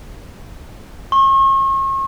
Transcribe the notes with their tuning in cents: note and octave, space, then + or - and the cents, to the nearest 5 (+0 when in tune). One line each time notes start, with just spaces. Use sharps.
C#6 -40